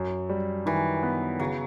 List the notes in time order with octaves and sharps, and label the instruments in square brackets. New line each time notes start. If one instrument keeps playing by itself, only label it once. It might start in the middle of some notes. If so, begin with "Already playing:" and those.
Already playing: [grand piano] F#2
G3
[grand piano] D#3 [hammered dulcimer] E3
[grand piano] B3
[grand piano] C#3 [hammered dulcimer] F#3